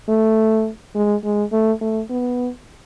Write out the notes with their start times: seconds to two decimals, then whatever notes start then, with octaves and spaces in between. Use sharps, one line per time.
0.09 A3
0.95 G#3
1.24 G#3
1.52 A3
1.81 A3
2.10 B3